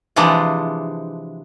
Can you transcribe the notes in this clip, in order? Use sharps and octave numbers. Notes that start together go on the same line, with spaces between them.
C3 E3 F3 G#3 D4